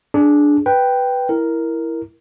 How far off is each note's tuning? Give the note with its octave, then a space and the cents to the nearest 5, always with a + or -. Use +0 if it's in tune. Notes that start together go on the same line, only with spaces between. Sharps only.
D4 +0 G#4 +20
B4 +0 G5 +0
E4 +0 A#4 +0